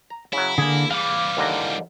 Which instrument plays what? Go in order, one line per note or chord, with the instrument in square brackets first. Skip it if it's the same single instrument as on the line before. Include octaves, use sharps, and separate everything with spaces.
[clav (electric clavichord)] A#5
[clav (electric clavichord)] C#3 F#3 [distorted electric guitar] E4
[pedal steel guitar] D3 A#3 [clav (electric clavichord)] G#4 G#5
[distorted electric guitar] E3 G3 [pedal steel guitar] F5 D6
[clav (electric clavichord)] D#2 D3 A#5